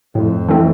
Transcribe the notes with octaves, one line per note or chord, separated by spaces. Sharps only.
F2 A2
E3 A3 C4